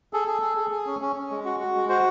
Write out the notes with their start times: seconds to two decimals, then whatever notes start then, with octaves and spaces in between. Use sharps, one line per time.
0.13 G#4 A4
0.28 G#4
0.42 G#4
0.57 G#4
0.71 G#4
0.87 C#4
1.01 C#4
1.16 C#4
1.31 G#3
1.45 F#4
1.60 F#4
1.75 G#3
1.89 F#4 C5